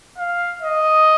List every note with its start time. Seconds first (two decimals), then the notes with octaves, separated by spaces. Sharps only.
0.18 F5
0.62 D#5